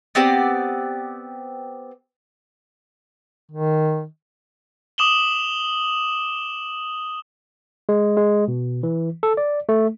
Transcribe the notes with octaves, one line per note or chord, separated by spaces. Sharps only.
B3 C4 G4 D5
D#3
D6 D#6 E7 F#7 G7
G#3
G#3
B2
E3
A4
D5
A3